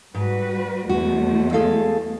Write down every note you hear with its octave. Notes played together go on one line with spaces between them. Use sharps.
G#2 G3 F#4 B4
E2 G#3 A3 F#4
G#4 A4 F5